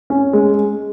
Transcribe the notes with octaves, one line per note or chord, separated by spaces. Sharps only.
C#4
G#3